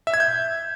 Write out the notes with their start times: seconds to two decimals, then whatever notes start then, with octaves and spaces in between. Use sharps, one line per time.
0.07 E5
0.14 G#6
0.20 G6